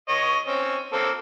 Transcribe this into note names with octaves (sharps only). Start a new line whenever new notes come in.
C#5 D#5
C4 C#4
A#3 C4 A4